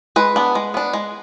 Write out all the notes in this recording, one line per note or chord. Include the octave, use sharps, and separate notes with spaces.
G#3 B4
B3 D4
G#3
B3 D4
G#3